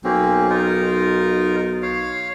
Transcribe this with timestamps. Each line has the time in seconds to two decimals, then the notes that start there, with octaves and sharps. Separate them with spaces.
0.04 B1 A#3 C4 C#4
0.50 D#4 F4 A#4
1.82 C#5 F5